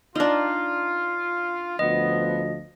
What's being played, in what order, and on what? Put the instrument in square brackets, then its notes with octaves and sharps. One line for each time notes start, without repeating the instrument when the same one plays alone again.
[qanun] D4 D#4 [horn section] F4
[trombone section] D2 F3 [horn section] B3 [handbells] D#5